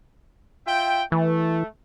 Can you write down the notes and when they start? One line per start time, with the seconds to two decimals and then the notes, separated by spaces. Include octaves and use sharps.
0.66 F4 E5 G5
1.12 E3 A3